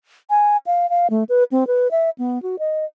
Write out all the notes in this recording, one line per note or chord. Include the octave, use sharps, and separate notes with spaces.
G#5
F5
F5
A3
B4
C4
B4
E5
B3
F#4
D#5